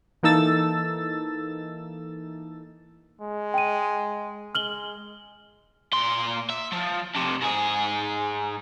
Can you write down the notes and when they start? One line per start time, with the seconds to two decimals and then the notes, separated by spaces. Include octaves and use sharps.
0.23 E3 A#3 D#4 A4 E6 A6
3.21 G#3
3.54 G5 D#7
4.55 G#3 F6 F#7 G7
5.93 A#2 C6
6.50 E5
6.73 F3
7.16 F2 C3
7.42 G#2 G#4